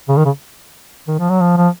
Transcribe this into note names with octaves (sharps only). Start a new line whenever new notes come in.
C#3
D#3
C#3
D#3
F3
F#3
F3
F3